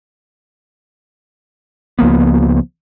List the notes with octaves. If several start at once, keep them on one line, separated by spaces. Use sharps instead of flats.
C#2 F3 A#3 B3